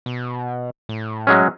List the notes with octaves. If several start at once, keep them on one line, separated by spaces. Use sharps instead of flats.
B2
A2
F#3 G#3 C#4